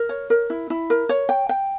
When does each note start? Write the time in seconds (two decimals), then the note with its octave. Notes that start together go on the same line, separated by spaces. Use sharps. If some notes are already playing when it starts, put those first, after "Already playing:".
Already playing: A#4
0.09 C#5
0.30 A#4
0.50 E4
0.70 E4
0.90 A#4
1.09 C#5
1.29 G5
1.49 G5